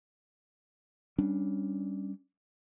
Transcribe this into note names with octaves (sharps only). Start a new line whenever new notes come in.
G3 C#4 D4